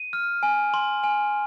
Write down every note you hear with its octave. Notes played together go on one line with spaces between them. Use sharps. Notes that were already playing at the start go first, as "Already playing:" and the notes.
Already playing: D#7
F6
G#5
C6
G#5